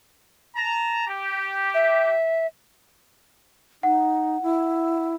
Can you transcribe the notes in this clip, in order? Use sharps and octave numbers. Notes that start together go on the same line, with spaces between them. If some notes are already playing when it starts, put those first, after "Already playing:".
A5 A#5
G4
E5
D#4 F#5
E4